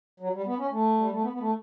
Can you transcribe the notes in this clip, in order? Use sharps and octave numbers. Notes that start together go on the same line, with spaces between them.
F#3
G3
B3
C#4
A3
G3
A3
B3
B3
A3